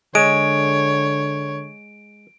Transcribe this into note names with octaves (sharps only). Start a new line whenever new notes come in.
D3 G#3 C#5 D7